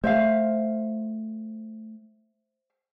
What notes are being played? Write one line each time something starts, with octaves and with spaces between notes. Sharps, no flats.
A3 C5 E5 F5